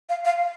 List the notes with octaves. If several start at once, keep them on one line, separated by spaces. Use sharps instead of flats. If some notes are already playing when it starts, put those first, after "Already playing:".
F5
F5